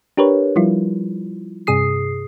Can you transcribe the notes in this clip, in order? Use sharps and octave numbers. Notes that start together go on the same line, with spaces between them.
D4 G4 A#4 B4 C#5
F3 G3 E4 F4
G2 C3 G#4 D#6 C7